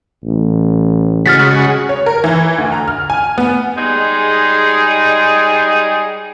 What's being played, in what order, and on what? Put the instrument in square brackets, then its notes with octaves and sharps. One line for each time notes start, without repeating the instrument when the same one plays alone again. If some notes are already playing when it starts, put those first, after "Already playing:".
[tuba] A1
[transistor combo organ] C#3 G#3 F#4 [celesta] F6 A6 B6
[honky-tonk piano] C#5
A#4
E3
D2
A#5
F6
G#5
B3
[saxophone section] G3 G#3 D#4 G#4